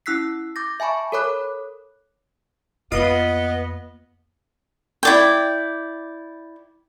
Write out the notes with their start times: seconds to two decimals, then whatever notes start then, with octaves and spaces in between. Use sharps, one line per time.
0.06 C#4 E4 E6 F#6 B6 C7
0.56 D6 G6 A6 A#6
0.80 E5 G#5 A5 B5 C#6
1.12 A4 A#4 C#5 B5 D6 F#6
2.92 F2 A#3 B3 F4 D#5 D#6
5.03 E4 D5 G5